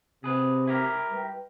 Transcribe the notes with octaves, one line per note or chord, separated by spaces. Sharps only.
C3 G#4 B4
E4 G4 A#4
G3 B4 G5